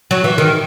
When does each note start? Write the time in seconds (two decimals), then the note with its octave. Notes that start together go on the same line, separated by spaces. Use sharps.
0.11 F#3
0.24 E3
0.38 D#3